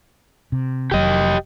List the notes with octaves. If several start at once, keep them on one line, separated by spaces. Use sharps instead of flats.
C3
F1 F#3 G4 D#5